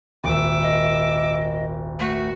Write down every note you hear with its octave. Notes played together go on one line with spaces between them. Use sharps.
D#1 G#1 E5 D6
D#5
A3 F#4